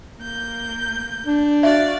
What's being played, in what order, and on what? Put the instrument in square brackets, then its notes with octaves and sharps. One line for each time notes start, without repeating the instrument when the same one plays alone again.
[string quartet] A#3 G6
[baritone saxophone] D4
[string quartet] F#4 D5 F5 [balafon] E5